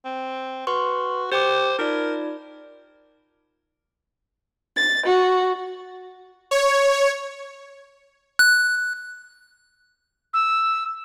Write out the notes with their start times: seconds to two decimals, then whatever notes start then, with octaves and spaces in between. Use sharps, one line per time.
0.05 C4
0.67 F#4 B4 C6 C#6
1.32 G4 C5 G5 D6
1.79 D#4 F4 A#4 D5
4.76 A6
5.05 F#4
6.51 C#5
8.39 F#6
10.33 E6